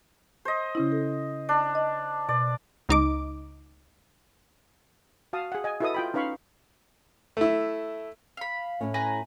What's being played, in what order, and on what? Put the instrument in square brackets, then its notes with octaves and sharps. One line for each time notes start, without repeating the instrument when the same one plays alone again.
[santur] C5 D#5
[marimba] C#3 C#4 E4
A4
[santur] D4
[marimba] D#5
[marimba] B2 [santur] D5
[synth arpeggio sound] C#2 D#4 D6
[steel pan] F#4 F5 A5 D#6
G#4 F#5
D#5 G#5
E4 F#4 A4 B4 D#5 D#6
F4 G5 B5
C#4 D#4 B4 F5 B5 C#6
[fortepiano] A3 E4
[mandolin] F5 B5
[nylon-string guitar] A2 A3 C#4
[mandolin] B4 G#5 A#5